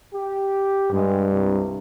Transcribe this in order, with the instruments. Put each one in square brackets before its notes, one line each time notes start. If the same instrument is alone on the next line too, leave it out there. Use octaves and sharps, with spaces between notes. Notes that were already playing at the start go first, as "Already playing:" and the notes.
[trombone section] G4
[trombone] G2 [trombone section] G#3
[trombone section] C2